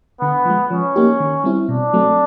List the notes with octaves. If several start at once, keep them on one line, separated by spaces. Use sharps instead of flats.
D3 B3
F3 G#3
F3 C#4
A#3 D#4 G4
D#3
G3 C4 E4
B2 D4
F#3 A3 C4